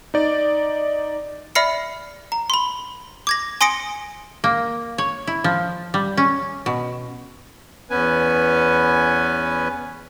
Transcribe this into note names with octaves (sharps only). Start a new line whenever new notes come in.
D#4 D5
D5 E5 B5 F6 C7 C#7
A#5
B5 C6
D6 G#6 A#6
G#5 C6 D#6 A#6 C#7 D7
A#3
C#5
E4
F3
G3
C#4
B2
E2 B3 C#4 B4 G#5